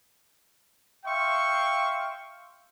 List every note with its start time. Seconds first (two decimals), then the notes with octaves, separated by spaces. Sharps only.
1.05 E5 F5 G5 C6 C#6